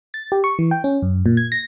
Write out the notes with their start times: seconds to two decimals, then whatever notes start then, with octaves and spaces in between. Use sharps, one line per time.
0.14 A6
0.32 G4
0.44 C#6
0.59 E3
0.71 G5
0.84 C#4
1.02 F#2
1.26 A#2
1.37 G#6
1.52 A#6